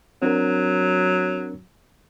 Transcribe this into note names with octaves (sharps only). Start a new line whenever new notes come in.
F#3 C4 D4 A#4